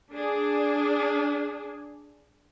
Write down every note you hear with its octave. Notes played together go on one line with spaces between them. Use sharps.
D4 G#4